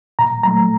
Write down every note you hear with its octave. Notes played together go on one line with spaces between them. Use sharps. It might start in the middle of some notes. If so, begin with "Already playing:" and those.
A#2 A#5
F#3 A3 A#5